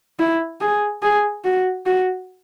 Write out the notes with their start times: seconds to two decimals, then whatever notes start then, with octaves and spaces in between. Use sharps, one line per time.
0.19 E4
0.61 G#4
1.02 G#4
1.44 F#4
1.86 F#4